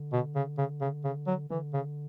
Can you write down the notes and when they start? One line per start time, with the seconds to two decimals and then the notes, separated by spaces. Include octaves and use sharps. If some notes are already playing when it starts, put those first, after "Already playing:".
Already playing: D3
0.13 B2
0.36 C#3
0.58 C#3
0.81 C#3
1.04 C#3
1.27 F#3
1.50 D3 E3
1.74 C#3